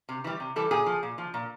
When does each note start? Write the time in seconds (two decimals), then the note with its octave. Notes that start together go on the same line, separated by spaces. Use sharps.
0.09 C3
0.24 E3 G3
0.40 C3
0.56 E3 G3 A4
0.71 A#2 G#4
0.86 F3
1.03 A#2
1.18 F3
1.34 A#2